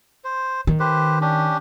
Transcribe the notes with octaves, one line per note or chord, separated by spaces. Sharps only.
C5
D#3
G4 B4 C5
C#4 D4 G4